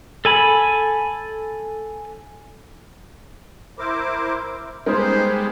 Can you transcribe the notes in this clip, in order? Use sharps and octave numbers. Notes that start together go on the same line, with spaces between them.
A4 G#5 B5
E4 A#4 C5 D6
G3 G#3 B3 D#4 A#4 C5